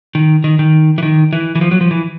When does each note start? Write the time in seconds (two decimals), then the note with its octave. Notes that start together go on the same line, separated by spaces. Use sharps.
0.15 D#3
0.44 D#3
0.59 D#3
0.98 E3
1.03 D#3
1.33 E3
1.55 E3
1.61 F3
1.71 F#3
1.81 F3
1.91 E3